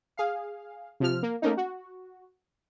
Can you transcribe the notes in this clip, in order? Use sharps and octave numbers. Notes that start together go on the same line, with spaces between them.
G#4 F5
C3 F3 F6
A#3
A3 A#3 C#4 D#4
F#4